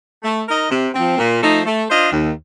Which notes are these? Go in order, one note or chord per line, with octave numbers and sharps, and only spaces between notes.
A3
D#4 A#4 D#5
C3
F3 C4
A#2
F3 A3 D#4
A3
D4 F4 C5 D#5
D#2